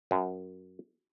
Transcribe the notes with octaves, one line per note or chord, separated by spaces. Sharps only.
F#2